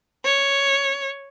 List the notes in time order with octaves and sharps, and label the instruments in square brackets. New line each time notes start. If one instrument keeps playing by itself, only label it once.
[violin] C#5